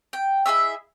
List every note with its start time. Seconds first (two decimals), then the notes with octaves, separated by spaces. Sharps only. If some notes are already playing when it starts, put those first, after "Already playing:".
0.13 G5
0.46 E4 G#4 D#5 E5